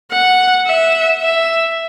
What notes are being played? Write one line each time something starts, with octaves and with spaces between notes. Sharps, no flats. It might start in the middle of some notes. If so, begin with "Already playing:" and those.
F#5
E5
E5